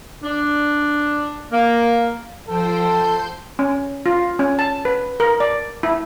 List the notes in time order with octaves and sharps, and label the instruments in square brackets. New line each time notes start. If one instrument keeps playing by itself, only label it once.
[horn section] D4
A#3
[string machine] F3 C5 G5 [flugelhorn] A4
[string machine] C6 G6
[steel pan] C#4
F4
C#4
A5
B4
A#4
D5
E4